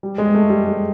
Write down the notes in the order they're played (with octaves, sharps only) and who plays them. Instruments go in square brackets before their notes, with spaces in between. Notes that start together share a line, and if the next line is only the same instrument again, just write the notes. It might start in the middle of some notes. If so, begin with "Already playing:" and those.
[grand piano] G3
G#3
A3
G3
G#3